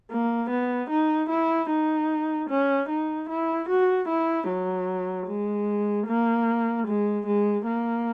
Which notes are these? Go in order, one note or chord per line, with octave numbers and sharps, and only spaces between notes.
A#3
B3
D#4
E4
D#4
C#4
D#4
E4
F#4
E4
F#3
G#3
A#3
G#3
G#3
A#3